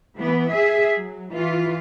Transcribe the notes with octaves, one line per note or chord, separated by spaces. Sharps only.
E3 B3
G#4 E5
F#3
E3 F4